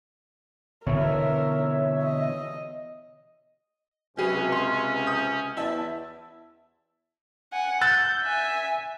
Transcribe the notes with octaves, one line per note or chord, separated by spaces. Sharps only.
B2 D3 E3 A#4 C#5 E5
D#5
C#2 C3 F#3 C#4 G#4 B4
C6
D#6 G6
E2 E4 E5 A5
F#5 G#5
E6 F#6 G6 A6
E5 G#5